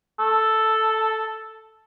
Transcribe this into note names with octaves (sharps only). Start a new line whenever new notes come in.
A4